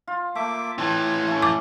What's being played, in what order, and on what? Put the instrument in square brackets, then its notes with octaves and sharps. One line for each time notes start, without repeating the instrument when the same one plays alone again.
[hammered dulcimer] F4
[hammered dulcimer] A3 [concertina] A#3 E5 D6
[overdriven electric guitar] A2 E3 [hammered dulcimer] C4 A5 [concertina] C#5
[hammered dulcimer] A3 C#4
[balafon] D6